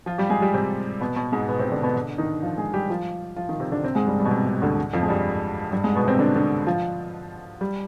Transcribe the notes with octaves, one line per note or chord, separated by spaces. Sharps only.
F3 F4
G3 G4
G#3 G#4
G3 G4
C3 C4
B2 B3
B2 B3
G#2 G#3
B2 B3
C3 C4
D3 D4
B2 B3
D3 D4
D#3 D#4
F3 F4
G#3 G#4
G3 G4
F3 F4
F3 F4
D#3 D#4
C3 C4
D3 D4
C3 C4
G#2 G#3
G2 G3
G2 G3
B2
C3
C3
D2 D3
F2 F3
G#3
G2 G3
G2 G3
G#2 G#3
B2 B3
C3 C4
D3 D4
D3 D4
F3 F4
G3 G4